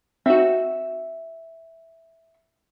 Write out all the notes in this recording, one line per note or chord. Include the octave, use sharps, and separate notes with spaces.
C4 D#4 F#4 E5